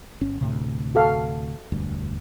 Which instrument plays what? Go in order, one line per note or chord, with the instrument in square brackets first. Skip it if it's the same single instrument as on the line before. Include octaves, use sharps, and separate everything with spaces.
[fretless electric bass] G1 C#4
D2 A2 C3
[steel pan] F#4 A4 F5
[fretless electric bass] E1 D2 G2